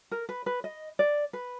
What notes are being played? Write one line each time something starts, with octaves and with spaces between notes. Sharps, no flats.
A#4
B4
B4
D#5
D5
B4